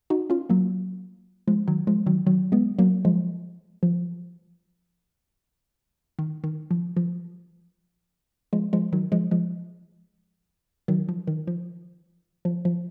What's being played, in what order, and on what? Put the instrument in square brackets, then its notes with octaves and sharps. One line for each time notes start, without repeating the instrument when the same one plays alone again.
[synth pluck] D#4 F#4
C#4 F4
F#3 A#3
F3 G#3
D#3 F#3
F3 G#3
D#3 F#3
D#3 F#3
G#3 B3
F#3 A#3
F3 G#3
F3
D#3
D#3
F3
F3
F3 G#3
F3 G#3
D#3 F#3
F3 G#3
F3 G#3
D#3 F#3
F3
D#3
F3
F3
F3